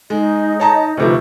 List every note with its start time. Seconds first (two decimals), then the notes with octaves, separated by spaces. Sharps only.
0.10 G#3 D#4 D#5
0.60 C#5 A5 A#5
0.97 D2 C3 F3 D#4 B4 C#6